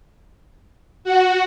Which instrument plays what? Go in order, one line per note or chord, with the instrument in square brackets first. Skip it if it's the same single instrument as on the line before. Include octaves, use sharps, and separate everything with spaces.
[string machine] F#4